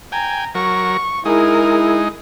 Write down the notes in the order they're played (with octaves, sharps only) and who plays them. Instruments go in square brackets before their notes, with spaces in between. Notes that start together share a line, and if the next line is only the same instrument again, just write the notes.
[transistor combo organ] G5 G#5 [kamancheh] A#5
[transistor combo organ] F#3 A#4 [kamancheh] C#6
[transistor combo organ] G#3 D#4 [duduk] E4 [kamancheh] G#4 A#4